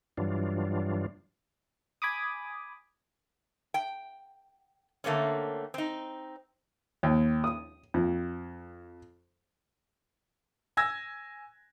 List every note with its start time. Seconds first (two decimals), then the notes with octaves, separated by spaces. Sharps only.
0.17 G2 E3 F#3 G3 D4 F4
2.02 G#5 B5 D6 D#6
3.74 G5
5.04 D3 A3 A#3 C4 C#4
5.74 C4 D#4
7.03 D#2
7.44 D#6
7.94 F2
10.77 G#5 E6 G#6 A#6